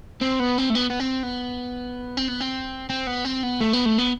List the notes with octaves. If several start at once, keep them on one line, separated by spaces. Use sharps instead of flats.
C4
B3
C4
A3
B3
B3
C4
B3
C4
B3
C4
C4
B3
C4
B3
A3
B3
A3
B3